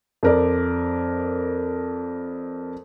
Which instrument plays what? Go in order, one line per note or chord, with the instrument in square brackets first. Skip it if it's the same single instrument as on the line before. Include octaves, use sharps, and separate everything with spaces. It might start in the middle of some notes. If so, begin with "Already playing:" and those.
[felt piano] F2 A#4 D5